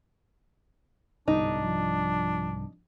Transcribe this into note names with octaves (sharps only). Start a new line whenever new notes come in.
G1 C2 G#2 D4 D#4
F3